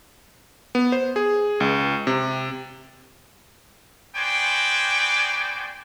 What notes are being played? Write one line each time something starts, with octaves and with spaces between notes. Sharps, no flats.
B3
C5
G#4
C#2
C3
B3 F#4 C5 D5 G5 G#5